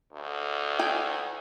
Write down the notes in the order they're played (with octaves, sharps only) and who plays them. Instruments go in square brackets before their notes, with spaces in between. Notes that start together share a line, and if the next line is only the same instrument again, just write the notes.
[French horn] D2
[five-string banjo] G5 G#5